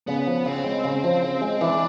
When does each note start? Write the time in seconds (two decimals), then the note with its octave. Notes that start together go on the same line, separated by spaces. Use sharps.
0.07 C#3 B3
0.27 F3
0.45 C#3 C4
0.64 G#3
0.84 C#3
1.04 F3
1.23 C#3
1.41 G#3
1.61 E3 D4